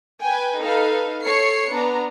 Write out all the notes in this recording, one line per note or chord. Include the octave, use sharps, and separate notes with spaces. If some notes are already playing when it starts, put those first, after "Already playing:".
B4 G5 G#5
D#4 A4 B4 F5
A4 C#5 C7 C#7
B3 D4 A#5